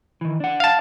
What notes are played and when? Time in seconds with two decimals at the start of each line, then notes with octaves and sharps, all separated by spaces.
0.21 D#3 E3
0.40 D4 F#5
0.60 F5 A5